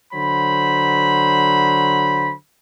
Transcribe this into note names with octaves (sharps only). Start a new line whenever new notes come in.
D3 F#3 C5 B5